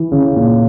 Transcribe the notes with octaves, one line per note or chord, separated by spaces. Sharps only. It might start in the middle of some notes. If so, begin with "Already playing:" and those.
Already playing: E3
C#3
A#2